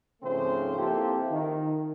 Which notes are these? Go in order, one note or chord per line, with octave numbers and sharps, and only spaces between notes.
G#2 C#3 F3 A3 C4 C5
A#3 C4 E4 F4 G4 A4
D#3